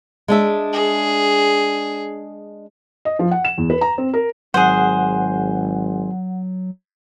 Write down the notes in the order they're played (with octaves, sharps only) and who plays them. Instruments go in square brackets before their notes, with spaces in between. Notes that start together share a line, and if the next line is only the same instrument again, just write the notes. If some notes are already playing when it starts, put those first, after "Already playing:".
[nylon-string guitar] G#3 D4 E5
[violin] G#4
[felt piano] D#5
F3
F#5
E7
E2
B4
A#5
C4
A#4
[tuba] G#1 [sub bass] F#3 [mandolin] G#4 C5 [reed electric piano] F#5